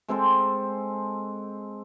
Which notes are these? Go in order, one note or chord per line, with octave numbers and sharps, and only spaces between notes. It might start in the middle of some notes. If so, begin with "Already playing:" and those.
G#3 C4 A4 C5